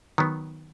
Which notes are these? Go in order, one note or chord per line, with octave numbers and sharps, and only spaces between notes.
D#3 F#3 B3